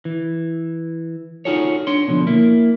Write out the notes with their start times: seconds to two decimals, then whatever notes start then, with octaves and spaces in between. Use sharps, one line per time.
0.05 E3
1.45 D#4 F4 F#4 G#4 A4 C#5
1.87 D4 C#5 C6
2.08 B2 D3 F3
2.27 A#3 E4